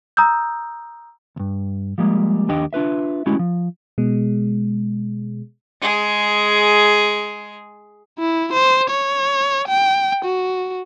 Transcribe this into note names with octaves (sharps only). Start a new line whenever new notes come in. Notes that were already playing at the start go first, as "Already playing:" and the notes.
A#5 D#6 E6 G6
D2 G2
F3 G3 G#3 A#3
D#2 D4 G4 D#5 G5
D4 F4 B4 E5
G#3 A3 C#4 E4 F#4 G4
F3
B2 G#3
G#3 G#4
E4
C5
C#5
G5
F#4